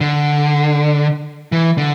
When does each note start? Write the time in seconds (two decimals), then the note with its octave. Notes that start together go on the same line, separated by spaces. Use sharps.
0.01 D3
1.52 E3
1.78 D3